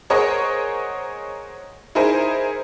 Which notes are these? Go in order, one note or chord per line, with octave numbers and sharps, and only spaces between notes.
G#4 A#4 C5 C#5 D#5 F#5
D#4 E4 G#4 A#4 C5